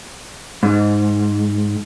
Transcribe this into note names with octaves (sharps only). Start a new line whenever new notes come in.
G#2